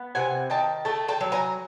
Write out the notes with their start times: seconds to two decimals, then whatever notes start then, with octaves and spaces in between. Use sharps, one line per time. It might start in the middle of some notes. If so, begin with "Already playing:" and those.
Already playing: B3
0.15 C3 F#5 G#5
0.50 D#3 G5 A5
0.85 A3 G5 A5
1.08 G5 A5
1.21 F#3
1.32 G#5 A#5